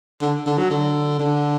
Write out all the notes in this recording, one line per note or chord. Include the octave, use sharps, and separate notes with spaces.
D3
D3
F#3
D3
D3